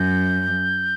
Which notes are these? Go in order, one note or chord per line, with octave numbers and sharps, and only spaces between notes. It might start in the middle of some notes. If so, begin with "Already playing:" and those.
Already playing: F#2 G6